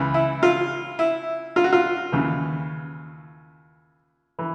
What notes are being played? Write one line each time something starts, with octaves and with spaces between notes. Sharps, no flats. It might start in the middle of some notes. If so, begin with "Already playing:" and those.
Already playing: C#2 C#3 E3
E4
F4
E4
F4
F#4
F4
D#2 C#3 E3
E3